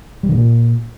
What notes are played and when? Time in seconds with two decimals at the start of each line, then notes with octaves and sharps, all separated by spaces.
0.23 G3
0.29 D3
0.35 A#2